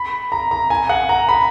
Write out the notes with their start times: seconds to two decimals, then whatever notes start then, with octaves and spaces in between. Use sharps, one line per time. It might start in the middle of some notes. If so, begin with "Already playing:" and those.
Already playing: B5
0.32 A#5
0.51 A#5
0.70 G#5
0.89 F#5
1.09 A#5
1.29 B5